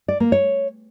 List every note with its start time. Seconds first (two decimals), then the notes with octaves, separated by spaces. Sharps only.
0.08 D5
0.20 A#3
0.32 C#5